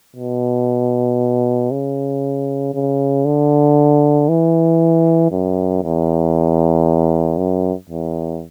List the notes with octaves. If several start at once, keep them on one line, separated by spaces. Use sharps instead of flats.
B2
C#3
C#3
D3
E3
F#2
E2
F#2
E2